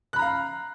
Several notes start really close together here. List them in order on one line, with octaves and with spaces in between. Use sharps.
F#6 B5 A#5 F5